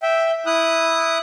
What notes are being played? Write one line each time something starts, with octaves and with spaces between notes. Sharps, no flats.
E5 G5
E4 D#6 F#6